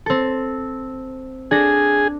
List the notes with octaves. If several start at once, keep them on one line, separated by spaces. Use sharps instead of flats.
C4 A4
D4 G#4 A4 A#6